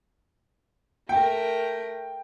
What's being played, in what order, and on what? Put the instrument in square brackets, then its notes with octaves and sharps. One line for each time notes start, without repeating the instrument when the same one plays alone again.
[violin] A3 A#4 [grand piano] G5